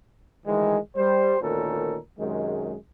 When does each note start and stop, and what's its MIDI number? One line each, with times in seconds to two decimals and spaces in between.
0.46 0.78 38
0.46 0.78 51
0.46 0.78 52
0.46 0.78 56
0.96 1.37 55
0.96 1.37 72
1.41 1.98 38
1.41 1.98 46
1.41 1.98 51
1.41 1.98 61
1.41 1.98 69
1.41 1.98 70
2.18 2.74 42
2.18 2.74 48
2.18 2.74 51
2.18 2.74 56